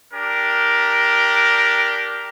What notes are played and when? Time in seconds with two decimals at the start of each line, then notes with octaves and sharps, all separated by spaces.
0.14 D4 G4 A#4